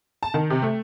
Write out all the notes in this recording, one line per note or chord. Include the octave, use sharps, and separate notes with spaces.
A5
D#3
C3
A3